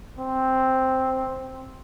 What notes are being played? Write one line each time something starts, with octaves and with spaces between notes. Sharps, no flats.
C4